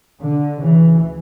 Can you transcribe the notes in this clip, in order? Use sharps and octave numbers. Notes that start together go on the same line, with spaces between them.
D3
D2 C#3 E3